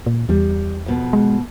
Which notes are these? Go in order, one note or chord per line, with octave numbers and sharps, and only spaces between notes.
A#2
E2 G3
F2 B2 B3
G#3